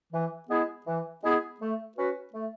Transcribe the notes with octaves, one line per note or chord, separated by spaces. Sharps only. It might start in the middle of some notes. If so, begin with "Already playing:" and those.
E3
G#3 B3 E4 G#4
E3
G#3 B3 E4 G#4
A3
C#4 F#4 B4
A3